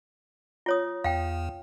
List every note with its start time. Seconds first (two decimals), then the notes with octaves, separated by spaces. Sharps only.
0.66 F4 C#5 D#6
1.04 E2 F5 G5